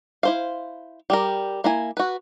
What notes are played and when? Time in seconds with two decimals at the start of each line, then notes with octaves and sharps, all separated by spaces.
0.23 E4 C5 F5
1.10 G3 G4 A#4
1.64 A#3 E4 G#5
1.97 F#4 B4